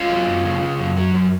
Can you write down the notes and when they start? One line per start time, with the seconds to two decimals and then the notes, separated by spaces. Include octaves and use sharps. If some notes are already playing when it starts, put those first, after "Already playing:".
Already playing: C#4 F4
0.09 F#3
0.27 F#2
0.44 C#3
0.62 C#3
0.80 F#2
0.97 F#3
1.14 F#2